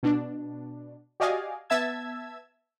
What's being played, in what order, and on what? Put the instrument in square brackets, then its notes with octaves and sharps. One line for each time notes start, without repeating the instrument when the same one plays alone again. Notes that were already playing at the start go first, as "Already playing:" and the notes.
[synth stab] B2 D4
F#4 G4 D5 D#5 F5 G#5
B3 E5 A5 E6 G#6